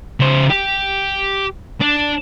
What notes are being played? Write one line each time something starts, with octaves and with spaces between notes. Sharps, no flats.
C#3 C5
G4
D4